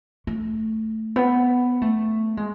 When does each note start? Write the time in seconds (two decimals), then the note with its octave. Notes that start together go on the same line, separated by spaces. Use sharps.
0.27 A3
1.16 B3
1.82 A3
2.37 G#3